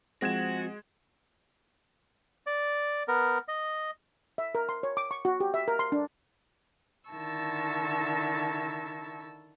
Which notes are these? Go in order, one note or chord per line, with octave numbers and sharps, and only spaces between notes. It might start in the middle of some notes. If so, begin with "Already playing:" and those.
F3 G#3 C4 F#4 G#6 E7
D5
B3 A#4
D#5
E5
A#4
C6
C#5
D6
C#6
F#4
G4
E5
A#4
C6
D4
D3 D#3 E4 A5 C#6 E6